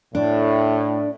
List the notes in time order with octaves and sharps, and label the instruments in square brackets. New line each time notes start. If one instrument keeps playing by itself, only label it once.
[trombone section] A2 [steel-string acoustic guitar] D4